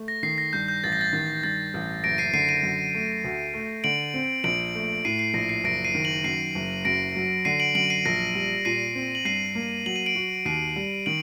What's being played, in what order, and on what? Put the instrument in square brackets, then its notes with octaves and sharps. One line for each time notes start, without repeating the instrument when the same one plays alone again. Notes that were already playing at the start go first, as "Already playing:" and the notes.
Already playing: [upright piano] A3
[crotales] A#6
[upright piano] D#3 [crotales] C7
[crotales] A#6
[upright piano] G2 [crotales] G6
[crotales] G6
[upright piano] A1 [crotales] A6
[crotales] A#6
A6
[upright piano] D#3
[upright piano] G2 [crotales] A6
[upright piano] A1
[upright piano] F#1 [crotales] A#6 D7
[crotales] C7 D#7
[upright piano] D3 [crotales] C7 D#7
[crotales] C7 D#7
[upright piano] F#2
A3
D2
A3
[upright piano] D3 [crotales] D7 F#7
[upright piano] C4
[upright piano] A#1 [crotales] D7 F#7
[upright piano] A3
[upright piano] A2 [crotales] C7 D#7
[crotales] C7
[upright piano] A#1 [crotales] A#6
[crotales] C7
[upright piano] F#1 [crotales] A#6 D7
[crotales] C7 D#7
[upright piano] D#3
[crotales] D7 F#7
[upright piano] F#2 [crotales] C7 D#7
[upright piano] F#1
[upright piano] F#2 [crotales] A#6 D7
[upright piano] F#3
[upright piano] D3 [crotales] C7 D#7
[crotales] D7 F#7
[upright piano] F#2 [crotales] D7 F#7
[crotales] C7 D#7
[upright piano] A#1 [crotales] A#6 D7
[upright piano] G3
[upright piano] A#2 [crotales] C7 D#7
[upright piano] C4
[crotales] F#7
[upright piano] G2 [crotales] C7 D#7
[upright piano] A#3
[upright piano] F#3 [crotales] F#7
[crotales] D#7
D7 F#7
[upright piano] F#4
[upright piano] D#2 [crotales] C7 D#7
[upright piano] G3
[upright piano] D#3 [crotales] D7 F#7